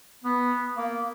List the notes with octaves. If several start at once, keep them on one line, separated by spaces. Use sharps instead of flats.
B3
A#3